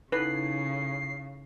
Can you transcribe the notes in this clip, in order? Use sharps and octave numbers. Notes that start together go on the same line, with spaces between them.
C#3 D#4 E4 A4 B4 C7